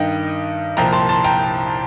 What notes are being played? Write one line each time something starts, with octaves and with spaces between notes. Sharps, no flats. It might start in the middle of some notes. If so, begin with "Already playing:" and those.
Already playing: G2 D#3 D#5 G5
C2 A#2 F3 G5 A#5
A5 C6
A5 C6
G5 A#5